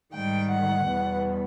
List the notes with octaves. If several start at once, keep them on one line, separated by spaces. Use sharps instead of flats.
G#2 D#3 G3 G5
F#5
E2 B2 G3 B3